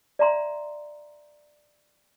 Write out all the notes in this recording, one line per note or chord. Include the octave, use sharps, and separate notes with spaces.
D5 E5 A#5 C6